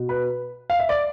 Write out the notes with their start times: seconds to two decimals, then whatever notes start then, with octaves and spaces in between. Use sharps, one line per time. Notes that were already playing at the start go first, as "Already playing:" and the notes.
Already playing: B2
0.09 B4
0.70 F5
0.79 E5
0.89 D5